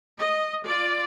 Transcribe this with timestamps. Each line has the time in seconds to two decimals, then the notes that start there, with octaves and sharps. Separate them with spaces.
0.18 D#5
0.66 F4 D5